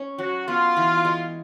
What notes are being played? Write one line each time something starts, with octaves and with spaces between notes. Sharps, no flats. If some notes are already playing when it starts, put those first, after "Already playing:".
Already playing: C#4
F#3 F#4
B3 F4
E3
G#3